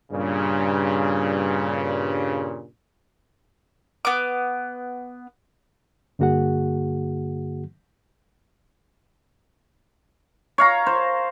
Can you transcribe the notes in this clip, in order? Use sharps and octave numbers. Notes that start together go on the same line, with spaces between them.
G2 A#2 C#3
B3 D6
G2 D3 A#3 F#4 G#4 F#5
C#5 F5 A#5
C5